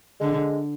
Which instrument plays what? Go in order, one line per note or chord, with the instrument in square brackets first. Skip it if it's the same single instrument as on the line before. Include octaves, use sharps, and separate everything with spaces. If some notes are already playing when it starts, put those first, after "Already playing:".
[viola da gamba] D3 [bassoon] G#3